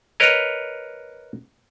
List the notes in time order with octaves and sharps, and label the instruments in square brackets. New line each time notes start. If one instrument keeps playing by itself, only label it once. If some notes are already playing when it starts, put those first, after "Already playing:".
[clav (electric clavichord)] A#4 B4 C#5 D#5